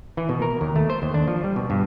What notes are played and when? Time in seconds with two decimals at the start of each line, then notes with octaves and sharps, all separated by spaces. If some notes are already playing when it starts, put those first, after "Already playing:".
0.17 E3
0.29 B2
0.42 A#4
0.61 D#2
0.76 A3
0.90 C5
1.02 D#2
1.14 D4
1.28 F3
1.44 G3
1.56 B2
1.70 G2